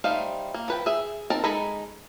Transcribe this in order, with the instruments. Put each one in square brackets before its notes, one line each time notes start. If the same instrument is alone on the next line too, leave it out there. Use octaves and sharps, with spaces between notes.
[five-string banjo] G3 A3 D#4 C5 F5
A#3
F3 B4 G5
G#4 E5
C4 D#4 A#4 A5
G#3 D#4 A4 A#5 B5